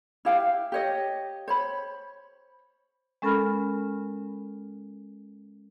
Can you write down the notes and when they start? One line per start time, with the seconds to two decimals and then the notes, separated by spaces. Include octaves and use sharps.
0.25 E4 G4 F5 G5
0.72 G4 C#5 D#5
1.48 C5 C#5 B5
3.22 G#3 C#4 A4 A#4 B5 F6